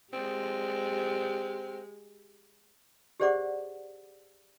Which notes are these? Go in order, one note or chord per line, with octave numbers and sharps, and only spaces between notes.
G#3 C4 G4
G4 G#4 C5 D5 F#5 D6